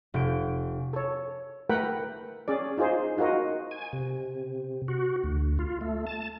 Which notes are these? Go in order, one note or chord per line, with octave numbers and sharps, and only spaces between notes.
F1 G6 D7
A4 C#5
A3 A#4 B4 F#5 G5 B5
C#4 G#4 D5
D#4 F4 G#4 C5
D#4 F4 F#4 A#4 D#5
G#5
C3
F#4
D2
F4
A3
A5